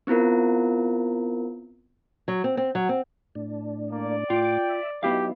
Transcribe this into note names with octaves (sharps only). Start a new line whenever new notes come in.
B3 C4 E4 F4 A#4
F#3
C4
C4
F#3
C4
A2 D4
A#3 D5
A2 F4 G5 D6
E5
F#3 B3 D#4 E4 G4 F5